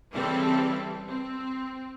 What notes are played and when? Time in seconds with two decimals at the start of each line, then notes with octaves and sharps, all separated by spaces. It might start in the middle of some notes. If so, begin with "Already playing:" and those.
0.13 C#3 E3 G3 C4 A4
1.06 C4